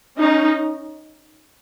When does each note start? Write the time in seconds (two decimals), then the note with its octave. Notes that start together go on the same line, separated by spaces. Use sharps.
0.18 C#4 D#4